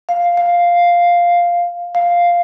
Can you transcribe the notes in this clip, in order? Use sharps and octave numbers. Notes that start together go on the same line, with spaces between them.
F5
F5
F5